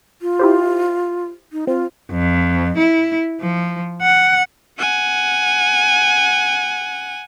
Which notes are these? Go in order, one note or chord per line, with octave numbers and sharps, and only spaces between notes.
F4
E4 G4 C5
D#4
C4 F4
F2
E4
F3
F#5
F#5 G#5